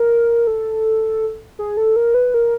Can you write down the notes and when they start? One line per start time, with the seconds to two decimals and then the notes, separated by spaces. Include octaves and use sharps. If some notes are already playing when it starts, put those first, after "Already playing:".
Already playing: A#4
0.47 A4
1.59 G#4
1.77 A4
1.96 A#4
2.14 B4
2.34 A#4